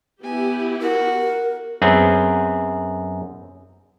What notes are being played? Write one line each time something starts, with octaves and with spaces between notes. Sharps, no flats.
B3 E4 G4 G#5
F#4 A#4
F#2 B3 C4 G#4